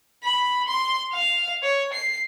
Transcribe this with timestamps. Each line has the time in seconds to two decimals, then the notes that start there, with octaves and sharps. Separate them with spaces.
0.24 B5
0.68 C6
1.13 F5
1.63 C#5
1.93 C7